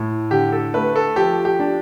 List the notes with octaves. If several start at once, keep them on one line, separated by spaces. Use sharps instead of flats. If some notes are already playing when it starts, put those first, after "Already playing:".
Already playing: A2
D3 G4
A4
A3 B4
A4
F3 G4
G4
D4